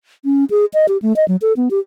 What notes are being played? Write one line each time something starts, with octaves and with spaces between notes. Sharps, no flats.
C#4
G#4
D#5
G4
A3
D#5
F#3
A4
B3
G4